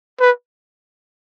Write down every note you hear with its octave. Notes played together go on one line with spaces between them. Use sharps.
B4